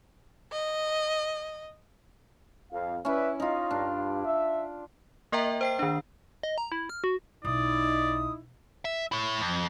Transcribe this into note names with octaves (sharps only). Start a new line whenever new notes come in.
D#5
F2 F5
C#4 E4 B4 D5 E5
D#4 F4 D#5
G2 D4
E5
A#3 A#4 D#5 E5 G5 A#5
C5 G5 C7
D#3 D4
D#5
A#5
E4
F6
F#4
B1 D#4 E4 D5 D#6
E5
E4 C#5
F2